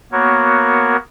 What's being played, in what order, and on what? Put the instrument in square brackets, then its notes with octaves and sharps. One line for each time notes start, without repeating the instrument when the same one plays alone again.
[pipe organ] A#3 B3 F#4 A#4 C#5